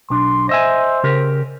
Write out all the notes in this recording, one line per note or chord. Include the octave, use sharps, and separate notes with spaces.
B1 D4 C6
C5 D#5 E5 G#5
C#3 G4 A#4